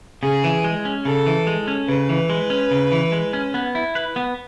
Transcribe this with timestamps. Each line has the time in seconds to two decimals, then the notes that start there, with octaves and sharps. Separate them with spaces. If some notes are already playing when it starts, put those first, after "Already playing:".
0.22 C#3 G#4
0.44 E3
0.64 G#3
0.85 C#4
1.05 C#3 A4
1.27 E3
1.47 G#3
1.68 C#4
1.88 C#3 B4
2.09 E3
2.30 G#3
2.50 C#4
2.71 C#3
2.92 E3
3.12 G#3
3.33 C#4
3.54 B3
3.75 E4
3.95 B4
4.16 B3